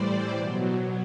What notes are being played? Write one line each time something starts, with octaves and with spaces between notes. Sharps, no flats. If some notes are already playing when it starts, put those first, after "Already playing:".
Already playing: A2 E3 G3 C5 D5
B2 F#3